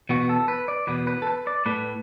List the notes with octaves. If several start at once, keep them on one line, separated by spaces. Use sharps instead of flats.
E2 B2 B3 F#4
A4
B4
D5
E2 B2 B3 B4
B4
A4
B4
D5
A2 A3 B4